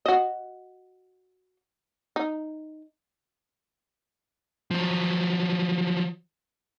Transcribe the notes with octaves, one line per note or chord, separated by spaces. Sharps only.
F#4 D#5
D#4
F3 F#3